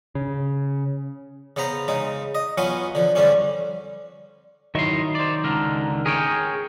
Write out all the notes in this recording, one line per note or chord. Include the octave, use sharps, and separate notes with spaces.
C#3
C#3 B3 C5 A#5
C#3 G#3 D#4
D#5
F#3 B3 C#4 F4 F#5 G#5
D3 F3
G2 D3 G3 C4 C#4
D#3 F#3 E4 D#5 C6 C#6
C5 D5
C#2 D3 A#4
G#4 A#4 C#5 G5